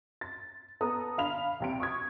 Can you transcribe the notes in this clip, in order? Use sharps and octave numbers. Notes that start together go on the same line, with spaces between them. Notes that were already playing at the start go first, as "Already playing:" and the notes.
A6
B3 A4 A#5 D#6
D3 D4 F5 B5 F7
C2 C3 D7
C#6 D#6 G#6